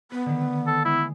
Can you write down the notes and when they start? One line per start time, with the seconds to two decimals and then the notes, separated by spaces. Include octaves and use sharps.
0.11 B3 B4
0.26 D3 D#3
0.41 A3
0.67 A4
0.85 G#3 E4 D#6